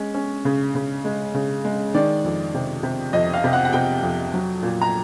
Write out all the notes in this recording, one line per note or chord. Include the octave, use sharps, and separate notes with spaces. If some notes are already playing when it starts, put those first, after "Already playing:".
Already playing: G#3 C#4
C#4
C#3
C#3
G#3
C#3
G#3
D#3 D5
F2
C3
C3
F2 D#5
F5
C3
F#5
F#5
C3 G5
F2
F#3
A#2
A#5